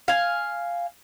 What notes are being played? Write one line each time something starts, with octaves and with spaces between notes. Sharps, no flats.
F5 G#5